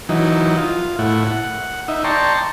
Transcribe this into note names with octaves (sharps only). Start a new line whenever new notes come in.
E3 F#3 D#4
F4
A2 E4 F#5
F#5
D#4 E5
D5 G5 A5 A#5 C6 C#6